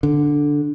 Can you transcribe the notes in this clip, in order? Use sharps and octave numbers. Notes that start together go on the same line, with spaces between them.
D3